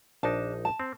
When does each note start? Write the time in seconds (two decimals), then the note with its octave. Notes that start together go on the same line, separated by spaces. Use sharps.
0.23 A#1 D4 D#4 A5
0.65 A5
0.80 C4